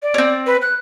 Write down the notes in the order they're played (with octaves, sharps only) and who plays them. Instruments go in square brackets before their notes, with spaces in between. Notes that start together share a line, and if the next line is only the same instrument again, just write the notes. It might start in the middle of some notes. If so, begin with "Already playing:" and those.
[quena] D5
[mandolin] C4 C#4
[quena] B4
F#6